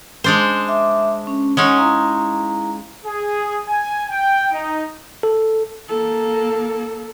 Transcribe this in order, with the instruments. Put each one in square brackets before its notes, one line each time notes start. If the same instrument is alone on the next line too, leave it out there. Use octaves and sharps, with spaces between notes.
[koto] G#3 D4 C5
[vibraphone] E5 D6
C#4
[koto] G#3 C#4 D#4 [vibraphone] C#5 F#5 C#6
[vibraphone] E4 F5 A#5
[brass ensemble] G#4
G#5
G5
D#4
[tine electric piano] A4
[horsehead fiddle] A#3 A4